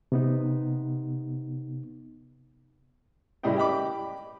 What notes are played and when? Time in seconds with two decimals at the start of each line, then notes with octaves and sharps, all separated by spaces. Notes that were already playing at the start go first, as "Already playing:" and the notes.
0.12 C3 B3 D#4
3.43 A2 C#3 G3 E4 D#5 G5
3.57 G4 D#5 B5 D6